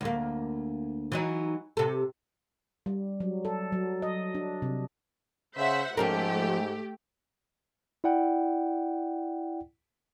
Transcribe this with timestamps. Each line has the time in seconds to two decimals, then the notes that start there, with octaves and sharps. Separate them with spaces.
0.01 D2 A#3
1.12 E3 F#3 D#4
1.77 C3 A4
2.86 G3
3.20 F#3
3.45 A4
3.72 F#3
4.02 D#5
4.35 D4
4.62 C3
5.57 C#3 C5 E5 F#5
5.97 G#2 F3 A3 C#4 G4 A#4
8.04 E4 D5 F#5 G5